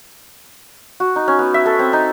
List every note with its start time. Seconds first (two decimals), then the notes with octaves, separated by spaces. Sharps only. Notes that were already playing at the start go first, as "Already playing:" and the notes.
1.00 F#4
1.16 D#4
1.28 C#4
1.39 B3
1.54 E5
1.66 A4
1.79 C4
1.93 D#4